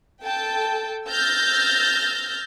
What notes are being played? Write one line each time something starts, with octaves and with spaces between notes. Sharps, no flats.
A4 G5 A5
E6 F6 G6 A6 A#6